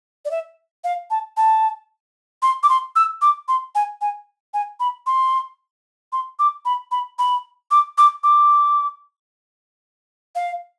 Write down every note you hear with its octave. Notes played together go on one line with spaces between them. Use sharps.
D5
E5
F5
A5
A5
C6
D6
C6
E6
D6
C6
G#5
G#5
G#5
B5
C6
C6
D6
B5
B5
B5
D6
D6
D6
F5